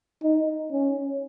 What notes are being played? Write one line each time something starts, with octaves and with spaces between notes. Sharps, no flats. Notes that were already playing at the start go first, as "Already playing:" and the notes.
D#4
C#4